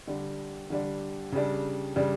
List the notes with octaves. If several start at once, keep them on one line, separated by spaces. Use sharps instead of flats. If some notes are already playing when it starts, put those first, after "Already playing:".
D3 G3 D4
D3 G3 D4
C#3 G3 D4
C#3 G3 D4